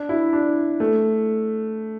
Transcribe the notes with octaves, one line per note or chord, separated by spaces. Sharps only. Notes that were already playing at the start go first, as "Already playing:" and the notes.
Already playing: D4
E4
D4
A3